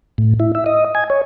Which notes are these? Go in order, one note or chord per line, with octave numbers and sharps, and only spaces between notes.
A2
E4
E5
D#5
G#5
C#5